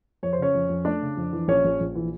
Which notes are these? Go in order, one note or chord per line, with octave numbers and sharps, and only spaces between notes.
F2 C#5
C5
C#3 C#4 C#5
F2
F2
A3 D4 D5
C#3
F2
E3
A#1 C#4 C#5
A#1
A#1
E3